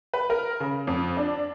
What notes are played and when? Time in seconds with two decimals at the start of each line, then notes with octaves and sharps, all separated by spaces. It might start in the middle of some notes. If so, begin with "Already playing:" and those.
0.14 B4
0.30 A#4
0.60 C#3
0.87 F2
1.17 D4